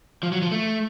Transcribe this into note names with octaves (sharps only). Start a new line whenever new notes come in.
F3
F#3
F3
A3